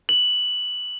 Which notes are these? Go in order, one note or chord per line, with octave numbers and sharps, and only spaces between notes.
F#7